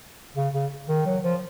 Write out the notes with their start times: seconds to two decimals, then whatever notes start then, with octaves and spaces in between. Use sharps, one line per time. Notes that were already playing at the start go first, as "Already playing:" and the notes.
0.36 C#3
0.54 C#3
0.89 D#3
1.06 F#3
1.23 F3